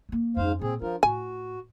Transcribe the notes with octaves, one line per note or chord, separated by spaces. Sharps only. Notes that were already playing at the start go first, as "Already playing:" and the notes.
F#3 A#3
F2 G#2 C#4 C5 F5
A#2 C4 G#4
F3 D4 F4 A#4
A2 F#4 G#5